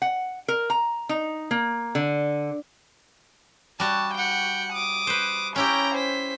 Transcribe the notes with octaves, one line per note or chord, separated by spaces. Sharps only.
F#5
A#4
A#5
D#4
A#3
D3
G3 F#4 A5
F#5 G5
D6 D#6
B4 C5
C#4 E4 G4 G5 A#5
C5 B6